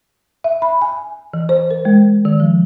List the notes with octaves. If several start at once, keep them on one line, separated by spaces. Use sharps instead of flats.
E5
B5
G#5
E3
C5
A#4
G#3
D#3
F3